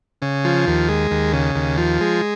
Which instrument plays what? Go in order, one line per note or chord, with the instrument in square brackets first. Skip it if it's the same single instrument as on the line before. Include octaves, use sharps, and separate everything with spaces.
[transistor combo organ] C#3
F3
D#2
G#3
D#2
C#3
D#2
F3
G#3